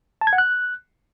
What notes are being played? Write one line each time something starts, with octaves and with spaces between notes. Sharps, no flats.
A5
G#6
F#5
F#6